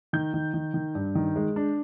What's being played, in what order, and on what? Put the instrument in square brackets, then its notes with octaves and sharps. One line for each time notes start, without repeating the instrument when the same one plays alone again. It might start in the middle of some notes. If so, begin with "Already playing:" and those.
[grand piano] D#3 G6
D#3
D#3
D#3
G2
D#3
G#3
D4